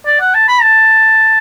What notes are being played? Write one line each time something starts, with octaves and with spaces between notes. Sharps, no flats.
D5
F#5
A5
B5
A5